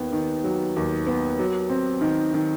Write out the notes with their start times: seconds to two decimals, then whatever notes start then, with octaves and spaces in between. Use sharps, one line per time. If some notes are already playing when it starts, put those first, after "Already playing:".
Already playing: D#2 D#3 B3
0.12 D#3
0.44 F#3
0.76 D#2
1.07 B3
1.39 F#3
1.69 C4
2.01 D#3
2.34 D#3